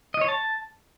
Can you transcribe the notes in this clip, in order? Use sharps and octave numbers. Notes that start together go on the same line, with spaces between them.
D#5
C#5
A5